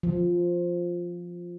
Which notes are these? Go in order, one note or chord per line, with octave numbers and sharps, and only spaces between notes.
F3